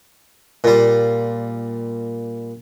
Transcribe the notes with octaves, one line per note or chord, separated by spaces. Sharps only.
A#2 G3